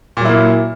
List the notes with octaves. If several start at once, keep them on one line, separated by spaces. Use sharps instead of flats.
A#2 F#3 A#3 E4